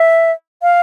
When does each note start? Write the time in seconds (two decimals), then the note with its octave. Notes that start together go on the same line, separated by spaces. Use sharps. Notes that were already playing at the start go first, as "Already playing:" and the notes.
Already playing: E5
0.62 F5